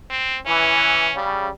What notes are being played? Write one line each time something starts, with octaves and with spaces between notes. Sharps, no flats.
C4
E3 C#4
C#3 G3